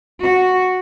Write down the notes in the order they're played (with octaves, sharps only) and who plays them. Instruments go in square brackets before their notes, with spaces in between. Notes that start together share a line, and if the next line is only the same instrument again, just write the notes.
[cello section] F#4